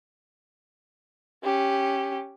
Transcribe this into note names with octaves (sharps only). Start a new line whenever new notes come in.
C#4 G4